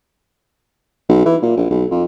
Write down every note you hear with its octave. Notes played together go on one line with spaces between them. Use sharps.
B1
E3
A#2
A#1
B1
F2